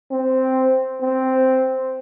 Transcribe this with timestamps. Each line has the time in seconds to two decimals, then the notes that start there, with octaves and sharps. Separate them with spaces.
0.11 C4
1.02 C4